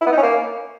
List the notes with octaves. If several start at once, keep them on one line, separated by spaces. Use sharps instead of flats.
E4
B3
D#4
C#4
A#3